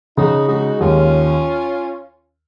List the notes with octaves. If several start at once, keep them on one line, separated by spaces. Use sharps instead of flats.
C#3 D#4 F#4
G#3 D#4 F#4
D#2 C#4 F4